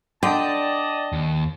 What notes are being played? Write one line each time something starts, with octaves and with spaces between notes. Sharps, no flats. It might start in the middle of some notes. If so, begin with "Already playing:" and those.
D3 D5 D#5 G5 A5
D#2